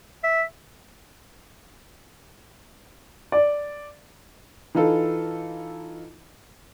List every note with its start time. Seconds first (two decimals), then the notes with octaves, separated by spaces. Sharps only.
0.24 E5
3.32 D5
4.75 E3 D#4 F4 A4